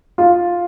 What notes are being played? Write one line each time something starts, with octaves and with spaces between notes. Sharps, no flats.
F4